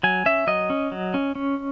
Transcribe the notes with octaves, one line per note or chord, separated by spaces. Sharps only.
F#3 G#5
C#4 E5
F#3 D#5
C#4
F#3
C#4
C#4